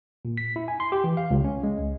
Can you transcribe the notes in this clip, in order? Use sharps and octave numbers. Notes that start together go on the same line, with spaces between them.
A#2
B6
E4
G#5
C6
G4
E3
F5
C#2
C#4
G#3
C#2